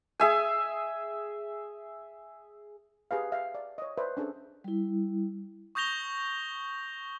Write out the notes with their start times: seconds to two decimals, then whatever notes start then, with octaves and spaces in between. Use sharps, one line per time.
0.20 G#4 E5 G#5
3.11 G4 G#4 B4 F5
3.32 E5 F5
3.54 D5
3.78 C#5 D#5
3.98 B4 C5 D5 E5
4.17 C#4 D4 G#4 A4
4.64 G3 E4
5.75 C#6 D#6 G6 A#6 F7 G7